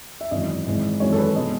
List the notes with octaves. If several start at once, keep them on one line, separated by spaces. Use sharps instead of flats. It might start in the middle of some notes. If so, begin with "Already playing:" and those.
E5
G#1 F#2 E3 D#5
G#1 G#2 E3 G#3
G#1 F#2 E3 G#3 C#5
A4
B4
B2 G#3 D#5